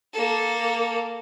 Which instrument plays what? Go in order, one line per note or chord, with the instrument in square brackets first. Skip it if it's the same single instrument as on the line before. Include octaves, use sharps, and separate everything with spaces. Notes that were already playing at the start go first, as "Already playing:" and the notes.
[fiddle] A#3 A4